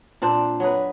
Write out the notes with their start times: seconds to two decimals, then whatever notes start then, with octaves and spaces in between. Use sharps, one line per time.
0.22 A#2 C4 D4 C5
0.60 F#3 G#4 B4